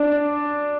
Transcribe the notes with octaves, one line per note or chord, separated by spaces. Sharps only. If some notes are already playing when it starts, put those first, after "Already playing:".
Already playing: D4